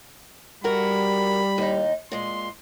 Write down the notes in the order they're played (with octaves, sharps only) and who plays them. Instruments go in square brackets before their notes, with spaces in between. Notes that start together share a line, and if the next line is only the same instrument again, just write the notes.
[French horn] G3 [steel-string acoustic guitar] F#4 A#4 [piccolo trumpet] B5
[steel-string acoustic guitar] D#2 D#4
[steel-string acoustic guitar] A#2 G#3 [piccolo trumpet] C6